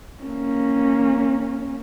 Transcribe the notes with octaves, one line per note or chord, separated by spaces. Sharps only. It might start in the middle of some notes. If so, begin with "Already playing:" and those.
A#3 C#4